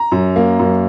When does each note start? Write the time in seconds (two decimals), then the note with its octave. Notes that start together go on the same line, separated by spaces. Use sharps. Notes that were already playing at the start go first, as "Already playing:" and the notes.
Already playing: A#5
0.12 F#2
0.36 A#3
0.59 F#2